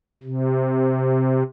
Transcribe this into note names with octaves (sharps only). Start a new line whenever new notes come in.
C3